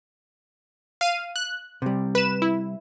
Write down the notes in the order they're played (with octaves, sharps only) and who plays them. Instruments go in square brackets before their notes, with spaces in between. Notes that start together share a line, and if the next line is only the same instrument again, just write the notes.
[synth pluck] F5 D#7
F#6
[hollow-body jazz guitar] C3 G3
[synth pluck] B4 E7
E4